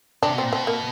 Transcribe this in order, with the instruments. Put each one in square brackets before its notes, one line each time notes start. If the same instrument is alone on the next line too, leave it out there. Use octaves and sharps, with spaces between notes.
[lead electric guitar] C3 [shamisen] D4
[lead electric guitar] B2
[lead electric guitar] A#2 [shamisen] C4
[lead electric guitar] B2 [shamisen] C4
[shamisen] A#3